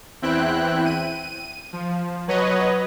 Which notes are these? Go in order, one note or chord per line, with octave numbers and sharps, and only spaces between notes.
E2 C4 E4 G5 F#6
D#7
F3
F#3 B4 C#5 D#5